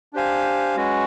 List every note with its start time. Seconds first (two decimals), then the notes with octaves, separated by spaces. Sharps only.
0.13 D4 G4 C5 F5 G#5
0.76 G#3 C#4 F#4 B4